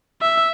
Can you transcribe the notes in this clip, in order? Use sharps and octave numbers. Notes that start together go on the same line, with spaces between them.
E5